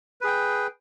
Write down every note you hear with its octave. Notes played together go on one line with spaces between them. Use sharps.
G#4 B4 G5